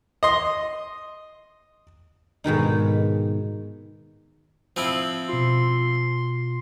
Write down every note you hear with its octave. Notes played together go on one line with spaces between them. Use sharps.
D#5 C6
G#2 B2 D#3 D#4
F3 C4 E4
B2 F4 C6